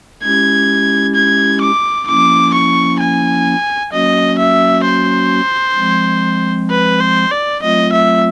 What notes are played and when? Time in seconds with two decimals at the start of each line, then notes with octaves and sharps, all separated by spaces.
0.24 G#3 C#4 E4 G4 G#6
1.15 G#6
1.61 D6
2.07 F3 A#3 C#4 E4 D6
2.54 C#6
3.00 G#5
3.92 F#3 A#3 C#4 F#4 D#5
4.38 E5
4.85 C5
5.77 F3 G#3 C4
6.70 B4
7.01 C5
7.31 D5
7.62 F#3 A3 C4 F4 D#5
7.92 E5